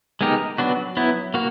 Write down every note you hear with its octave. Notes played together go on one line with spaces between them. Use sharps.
G#3 B3 D#4 G4 A#4
F#3 B3 D4 F#4
F#3 B3 E4
A#3 F#4